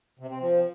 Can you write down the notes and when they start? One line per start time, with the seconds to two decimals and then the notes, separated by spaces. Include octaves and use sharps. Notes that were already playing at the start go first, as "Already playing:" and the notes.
0.19 C3
0.30 C4
0.41 F3